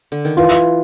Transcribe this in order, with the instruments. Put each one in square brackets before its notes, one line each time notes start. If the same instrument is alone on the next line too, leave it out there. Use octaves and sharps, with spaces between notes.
[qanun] D3
D#3
[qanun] E3 [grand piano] F4